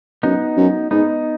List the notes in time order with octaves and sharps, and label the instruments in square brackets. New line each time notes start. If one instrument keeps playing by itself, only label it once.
[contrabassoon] F#2 [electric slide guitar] B3 D#4
[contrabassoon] F#2
[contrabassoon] G#2 [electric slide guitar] B3 D#4